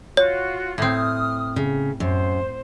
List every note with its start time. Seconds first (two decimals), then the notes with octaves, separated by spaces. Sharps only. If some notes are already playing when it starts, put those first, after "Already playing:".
0.17 F4 F#4 C#5
0.78 A2 C4 D#6 F6
1.56 C#3
2.00 F#2 C5